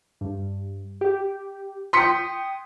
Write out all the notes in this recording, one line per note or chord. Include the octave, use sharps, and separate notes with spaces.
G2
G4
G5 C6 D#6 B6 C#7